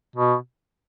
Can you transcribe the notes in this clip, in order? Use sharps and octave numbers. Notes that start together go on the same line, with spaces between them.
B2